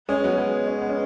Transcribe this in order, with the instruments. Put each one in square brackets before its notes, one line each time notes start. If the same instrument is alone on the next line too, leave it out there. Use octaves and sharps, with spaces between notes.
[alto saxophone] G#3 [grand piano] C#4
[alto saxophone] F#3 [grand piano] B3
[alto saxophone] G#3 [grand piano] B3
[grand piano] C#4
B3
C#4